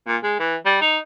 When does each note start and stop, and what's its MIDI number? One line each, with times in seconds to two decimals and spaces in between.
0.07 0.17 46
0.23 0.39 56
0.40 0.56 52
0.66 0.80 55
0.82 0.98 63